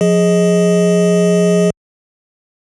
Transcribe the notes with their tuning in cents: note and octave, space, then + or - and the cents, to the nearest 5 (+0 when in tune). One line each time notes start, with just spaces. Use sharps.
F3 +30 G#4 +0 D#5 +10